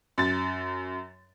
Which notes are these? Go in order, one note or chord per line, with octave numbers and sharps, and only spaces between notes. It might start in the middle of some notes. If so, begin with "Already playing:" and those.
F#2 A6